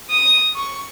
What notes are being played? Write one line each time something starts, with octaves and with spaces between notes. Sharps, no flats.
D#6
C#6